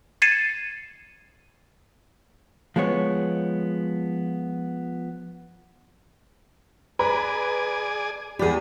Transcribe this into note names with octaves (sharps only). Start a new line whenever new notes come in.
G#6 A6 C7 C#7 D#7 E7
F3 G#3 B3 C#5
G#4 B4 D5 G#5 A#5 B5
E2 G4 G#4 D5 B5